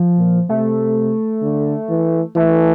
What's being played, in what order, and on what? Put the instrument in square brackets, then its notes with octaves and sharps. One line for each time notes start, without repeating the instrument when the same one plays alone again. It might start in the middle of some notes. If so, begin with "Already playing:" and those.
Already playing: [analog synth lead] F3
[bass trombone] A#2
[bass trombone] C3 [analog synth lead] A3
[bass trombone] D3
E3
[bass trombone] E3 [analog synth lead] A3